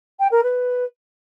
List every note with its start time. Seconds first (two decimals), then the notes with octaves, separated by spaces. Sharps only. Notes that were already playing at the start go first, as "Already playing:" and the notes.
0.19 G5
0.31 A#4
0.43 B4